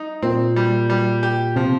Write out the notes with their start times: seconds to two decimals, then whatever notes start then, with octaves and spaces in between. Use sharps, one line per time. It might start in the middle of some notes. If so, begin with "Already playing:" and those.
Already playing: D#4
0.22 A#2 C4
0.56 G3
0.90 G3
1.23 G4
1.56 C3 F3